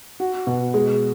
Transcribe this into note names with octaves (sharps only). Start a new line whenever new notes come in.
F#4
B2
G#3